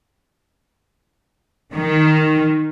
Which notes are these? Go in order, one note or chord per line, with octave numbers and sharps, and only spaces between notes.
D#3